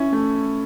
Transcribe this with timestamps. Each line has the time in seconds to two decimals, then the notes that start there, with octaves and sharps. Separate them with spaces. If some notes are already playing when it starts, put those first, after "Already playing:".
Already playing: C#4 E4
0.13 A3